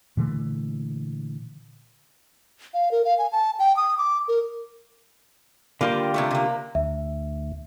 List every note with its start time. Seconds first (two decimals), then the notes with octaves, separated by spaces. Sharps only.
0.17 A#2 D3 E3 A3
2.74 F5
2.91 A#4
3.05 F5
3.18 G#5
3.32 A5
3.59 G5
3.77 D#6
3.98 D6
4.28 A#4
5.81 D3 G3 A#3 F4 G4
6.14 C3 G3 A3
6.31 C3 A#3
6.75 D2 E5